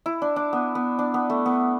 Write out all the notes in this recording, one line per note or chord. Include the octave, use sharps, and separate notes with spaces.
E4
D4
D4
B3
B3
D4
B3
A3
B3